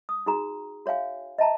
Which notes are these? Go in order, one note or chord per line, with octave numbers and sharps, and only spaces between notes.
D#6
D#4 F#4 G#4 A#5
F#4 C#5 E5 F5 G#5
D#5 E5 A5 A#5